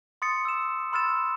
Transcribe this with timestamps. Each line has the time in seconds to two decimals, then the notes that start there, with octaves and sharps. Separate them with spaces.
0.22 C6 D#6 A6 C#7
0.45 E6 E7
0.92 B5 C6 E6 F6 A6 E7